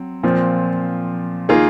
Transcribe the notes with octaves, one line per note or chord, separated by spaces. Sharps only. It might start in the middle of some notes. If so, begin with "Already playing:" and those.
Already playing: F#3 C4
A#2 F3 C4
D#3 A#3 F4 G#4